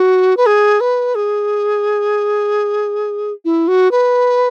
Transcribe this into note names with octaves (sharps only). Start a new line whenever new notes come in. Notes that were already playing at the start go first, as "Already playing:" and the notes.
Already playing: F#4
B4
G#4
B4
G#4
E4
F#4
B4